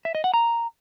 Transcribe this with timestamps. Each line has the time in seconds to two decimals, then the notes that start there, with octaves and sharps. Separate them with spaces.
0.05 E5
0.15 D#5
0.24 F#5
0.34 A#5